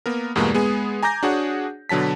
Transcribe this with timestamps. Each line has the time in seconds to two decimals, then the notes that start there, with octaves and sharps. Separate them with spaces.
0.06 A#3 B3 A#4
0.36 E2 G2 B2 G#3 A#3 D4
0.54 G#3 B3 G#4
1.03 G#5 A#5 D6 G6 A#6
1.23 D4 F#4 G#4 C#5 F#5
1.89 B2 D3 F#3 A5 B6